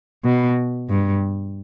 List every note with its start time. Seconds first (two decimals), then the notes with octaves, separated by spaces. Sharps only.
0.24 B2
0.90 G2